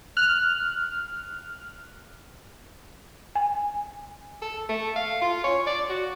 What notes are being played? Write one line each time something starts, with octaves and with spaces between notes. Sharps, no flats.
F6 F#6
G#5
A4
A3
F5
F4
C#5
D5
F#4